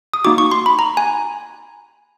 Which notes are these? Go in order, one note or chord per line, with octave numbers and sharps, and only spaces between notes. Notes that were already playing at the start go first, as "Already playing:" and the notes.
D#6
A#3 D#4 F#4 D6
C#6
C6
B5
A#5
G#5